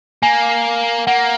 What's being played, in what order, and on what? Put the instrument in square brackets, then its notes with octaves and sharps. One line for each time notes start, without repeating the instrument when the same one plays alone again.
[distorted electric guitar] A#3 [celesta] G#5
[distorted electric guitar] A#3 [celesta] F#5